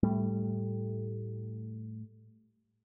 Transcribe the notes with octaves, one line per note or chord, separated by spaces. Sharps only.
A2 G3 A3